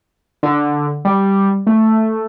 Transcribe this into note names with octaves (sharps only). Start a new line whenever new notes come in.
D3
G3
A3